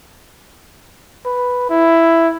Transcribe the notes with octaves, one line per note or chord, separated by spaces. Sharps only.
B4
E4